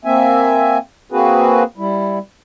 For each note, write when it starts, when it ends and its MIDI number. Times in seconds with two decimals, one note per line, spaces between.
0.05 0.78 58
0.05 0.78 60
0.05 0.78 76
0.05 0.78 80
1.12 1.63 58
1.12 1.63 60
1.12 1.63 66
1.12 1.63 68
1.12 1.63 71
1.78 2.19 55
1.78 2.19 64